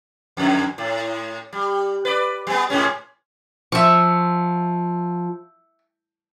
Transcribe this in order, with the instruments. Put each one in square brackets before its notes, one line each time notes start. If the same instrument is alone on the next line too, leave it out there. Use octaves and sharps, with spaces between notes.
[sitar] F2 D3
A2
G3
B4 D5
G3 B3
G#2 G#3 C#4
[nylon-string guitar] F3 [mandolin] E5 C#6